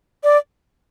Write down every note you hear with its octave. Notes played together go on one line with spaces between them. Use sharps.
D5